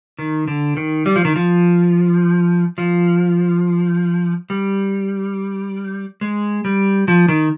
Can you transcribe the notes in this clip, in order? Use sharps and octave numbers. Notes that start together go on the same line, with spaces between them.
D#3
D3
D#3
G3
F3
D#3
F3
F3
G3
G#3
G3
F3
D#3